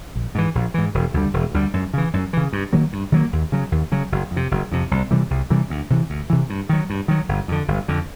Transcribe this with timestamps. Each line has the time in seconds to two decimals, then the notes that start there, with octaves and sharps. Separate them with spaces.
0.15 A#1
0.35 G#2 E3
0.55 A#1
0.74 G#2 E3
0.94 E1
1.14 D2 D3 G3
1.34 E1
1.54 D2 D3 G3
1.74 F#2
1.94 C#3 E3
2.13 F#2
2.33 C#3 E3
2.53 G2
2.73 D#3 F#3 A#3
2.93 G2
3.12 D#3 F#3 A#3
3.33 D#2
3.52 C#3 F#3
3.72 D#2
3.92 C#3 F#3
4.12 F#1
4.31 F2
4.36 C3
4.51 F#1
4.72 F2 C3
4.91 C2
5.11 C3 E3 G3
5.30 C2
5.50 C3 E3 G3
5.70 D2
5.90 C3 E3
6.10 D2
6.30 C3 E3
6.50 G2
6.69 D#3 F#3
6.90 G2
7.08 D#3 F#3
7.29 G1
7.48 F2 D3
7.68 G1
7.88 F2 D3